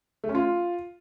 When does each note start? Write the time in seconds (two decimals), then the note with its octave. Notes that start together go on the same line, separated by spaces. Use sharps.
0.24 A3
0.29 C#4
0.35 F4